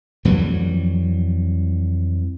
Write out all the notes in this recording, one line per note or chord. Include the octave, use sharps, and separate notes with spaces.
F2 E3 F#3 G3